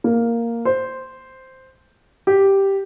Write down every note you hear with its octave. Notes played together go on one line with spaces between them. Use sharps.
A#3
C5
G4